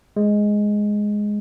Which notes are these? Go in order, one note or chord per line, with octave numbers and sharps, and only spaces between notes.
G#3